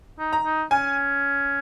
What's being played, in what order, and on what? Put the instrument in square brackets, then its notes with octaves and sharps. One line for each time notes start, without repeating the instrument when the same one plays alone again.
[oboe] D#4
[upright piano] A#5
[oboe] D#4
[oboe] C#4 [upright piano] G#5